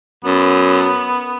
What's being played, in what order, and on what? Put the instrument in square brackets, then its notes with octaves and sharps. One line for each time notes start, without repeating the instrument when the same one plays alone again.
[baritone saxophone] F#2 [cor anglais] B3